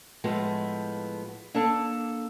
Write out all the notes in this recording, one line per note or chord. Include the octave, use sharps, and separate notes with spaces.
A2 F3 G#3 A3 B3
A#3 D4 A4 A5